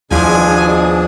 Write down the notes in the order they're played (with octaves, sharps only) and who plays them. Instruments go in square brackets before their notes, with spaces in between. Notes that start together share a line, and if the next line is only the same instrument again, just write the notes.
[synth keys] D#2 [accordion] B2 D4 G#4 [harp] F3 E4 [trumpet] G#5